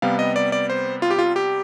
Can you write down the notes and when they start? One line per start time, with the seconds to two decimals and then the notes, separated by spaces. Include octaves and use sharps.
0.02 C3 G3 B3 F5
0.19 D#5
0.36 D5
0.52 D5
0.70 C5
1.02 F4
1.11 G4
1.19 F4
1.36 G4